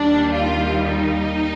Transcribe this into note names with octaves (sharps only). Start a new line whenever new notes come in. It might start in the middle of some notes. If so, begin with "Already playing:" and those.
Already playing: D#2 D#3 G3 D4
F4
D#4